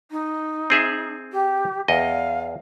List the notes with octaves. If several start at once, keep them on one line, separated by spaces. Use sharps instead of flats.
D#4
C4 G#4 E5
G4
E2 D#5 F5